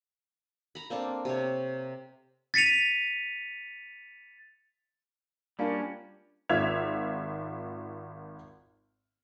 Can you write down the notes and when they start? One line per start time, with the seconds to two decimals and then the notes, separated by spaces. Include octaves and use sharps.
0.75 A#5 B5
0.90 A#3 C4 D4 A4
1.25 C3 C#5
2.54 A6 B6 C#7 D#7 F7
5.59 G3 A#3 C#4 D4 F4
6.49 G#1 F4 E5 G#6 F7